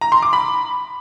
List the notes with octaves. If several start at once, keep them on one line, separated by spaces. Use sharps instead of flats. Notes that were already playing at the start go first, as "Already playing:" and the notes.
A#5
C6
D6
B5